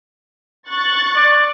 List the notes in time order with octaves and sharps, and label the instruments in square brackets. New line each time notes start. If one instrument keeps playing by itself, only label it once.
[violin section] C#6 F#6 A6
[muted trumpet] D5